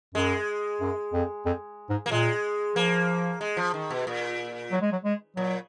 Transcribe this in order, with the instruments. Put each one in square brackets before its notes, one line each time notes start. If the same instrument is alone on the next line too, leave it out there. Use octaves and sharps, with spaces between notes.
[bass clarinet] F#2 [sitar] G#3
[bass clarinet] F#2
F2
F2
G#2
[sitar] A#3
[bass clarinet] A#2 [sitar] G#3
[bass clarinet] F3 [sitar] A#3
[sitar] G#3
F3
D#3
B2
A#2
[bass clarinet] F#3
G#3
F#3
G#3
[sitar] A#2 [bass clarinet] F#3